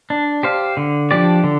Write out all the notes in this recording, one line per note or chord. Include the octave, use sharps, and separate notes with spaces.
D4
G4 C5 F5
D3
F3 D4 G4 D5
D3